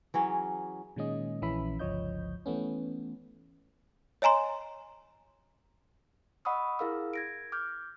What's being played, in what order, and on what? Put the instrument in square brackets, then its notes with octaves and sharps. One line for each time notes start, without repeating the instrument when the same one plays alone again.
[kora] E3 F#3 C#4 G#4
[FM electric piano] A#2 D#3 G#3 C#4 D#5
A#1 E3 C#4 E5 B5
G1 C#2 F3 C#5 D#5 G6
E3 A3 B3 C#4
[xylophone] C#5 D#5 G#5 A#5 C6
[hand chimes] D#5 F#5 B5 C#6 D#6 E6
E4 G#4 A#4 F5 E6
G#6 A#6 D7
D6 F6 G6